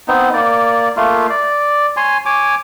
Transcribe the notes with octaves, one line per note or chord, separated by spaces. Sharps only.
B3 C4 D#4
A#3 D5
A3 A#3 F4
D5
C#5 G#5 C6
C#5 G#5 D6